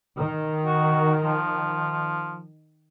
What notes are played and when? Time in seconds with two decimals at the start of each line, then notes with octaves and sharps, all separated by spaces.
0.18 D#3
0.65 F#4
1.24 F3